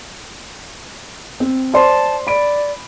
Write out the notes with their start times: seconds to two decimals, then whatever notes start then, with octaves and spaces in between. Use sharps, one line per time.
1.40 C4
1.74 C5 D5 A5 C6
2.27 D5 B5 D7